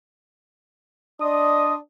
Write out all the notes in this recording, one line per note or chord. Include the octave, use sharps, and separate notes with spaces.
D4 D5 D#5 C6 D#6